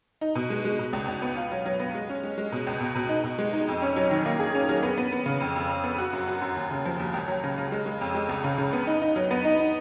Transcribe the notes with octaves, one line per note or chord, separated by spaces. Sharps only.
D#4
B2
G#3
G#3
B2
C#2
C#2
B3
F4
F#3
F#3
B3
G#3
C#4
G#3
G#3
B2
C#2
B2
B2
D#4
B2
G#3
D#4
F2
C#4
F#3
D#3
A#3
G#4
C#4
F#3
B3
B3
B3
C#3
F2
F2
F2
B3
F#4
F#2
F#4
F#2
D#2
C#3
F3
D#2
C#2
F#3
C#3
C#3
G#3
G#3
F2
G#3
C#2
C#3
C#3
B3
D#4
D#4
F#3
B3
D#4
D#4